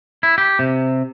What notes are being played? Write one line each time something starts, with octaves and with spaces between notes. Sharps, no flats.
E4
G4
C3